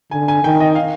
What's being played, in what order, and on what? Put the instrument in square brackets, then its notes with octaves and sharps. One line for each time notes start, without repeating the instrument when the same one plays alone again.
[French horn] D3 [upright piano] G#5
[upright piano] G#5
[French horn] D#3 [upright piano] G5
[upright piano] D#5
F5